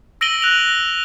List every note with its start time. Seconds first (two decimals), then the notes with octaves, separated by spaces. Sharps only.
0.21 E6 A#6 D7 D#7 F#7 G7
0.42 F#6 F7